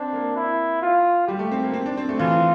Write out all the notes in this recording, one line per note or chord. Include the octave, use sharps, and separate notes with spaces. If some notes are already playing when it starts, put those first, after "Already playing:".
Already playing: C4 D4
A#3
E4
F4
G3 G4
A3
C4
A#3
C4
D4
C4
A3
E3 F4